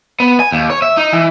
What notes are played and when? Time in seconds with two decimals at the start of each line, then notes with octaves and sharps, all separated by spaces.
0.20 B3
0.40 G#5
0.52 D#2
0.70 C#5
0.82 E5
0.97 D#4
1.12 E3